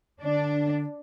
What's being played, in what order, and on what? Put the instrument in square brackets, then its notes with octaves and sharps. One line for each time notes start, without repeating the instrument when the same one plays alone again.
[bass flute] D3 [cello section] D4